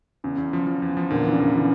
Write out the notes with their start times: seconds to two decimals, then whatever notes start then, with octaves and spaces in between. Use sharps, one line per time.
0.24 E2 C#3
0.38 E2
0.53 F3
0.67 F3
0.82 E2
0.97 F3
1.10 E2 A#2 D3
1.25 E3
1.33 C#3
1.40 E2
1.54 C#3 E3